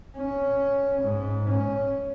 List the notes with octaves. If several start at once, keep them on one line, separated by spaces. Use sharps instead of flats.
C#4
G#2
C#4